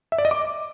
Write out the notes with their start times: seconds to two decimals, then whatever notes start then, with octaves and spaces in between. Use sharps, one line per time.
0.12 E5
0.18 D5
0.25 D#5
0.31 D6